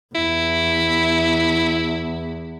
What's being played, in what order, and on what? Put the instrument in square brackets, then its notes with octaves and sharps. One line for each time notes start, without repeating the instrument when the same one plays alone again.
[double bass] E2 [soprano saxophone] E4